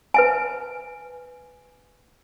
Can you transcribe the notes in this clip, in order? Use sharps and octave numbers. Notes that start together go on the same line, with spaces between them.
B4 E5 G#5